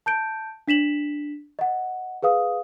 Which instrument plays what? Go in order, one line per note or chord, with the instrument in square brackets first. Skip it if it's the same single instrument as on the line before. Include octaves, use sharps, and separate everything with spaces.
[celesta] A5 G6 D7
D4 B6 E7 F#7
D#5 F#5
G#4 B4 F5 D#6